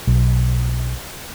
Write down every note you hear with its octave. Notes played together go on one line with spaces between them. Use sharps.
B1